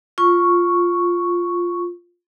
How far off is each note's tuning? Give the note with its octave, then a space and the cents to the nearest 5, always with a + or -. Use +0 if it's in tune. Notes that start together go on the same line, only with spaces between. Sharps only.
F4 +0 C#6 +0